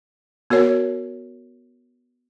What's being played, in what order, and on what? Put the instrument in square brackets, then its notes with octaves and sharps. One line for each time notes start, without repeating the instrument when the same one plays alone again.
[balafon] B3 F#4 A#4 C#5